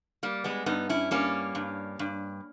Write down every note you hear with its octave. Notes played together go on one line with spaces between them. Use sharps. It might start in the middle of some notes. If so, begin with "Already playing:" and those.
G3 A#3
G#3 B3
G2 B3 D#4
C#4 E4
G3 A#3 C#4
G2
G2